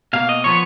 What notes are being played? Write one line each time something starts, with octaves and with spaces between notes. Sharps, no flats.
B2 A#3 F5
D#5
F3 B3 C#5